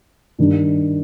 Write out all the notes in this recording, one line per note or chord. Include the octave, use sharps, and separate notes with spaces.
G2 D#3 G3 D4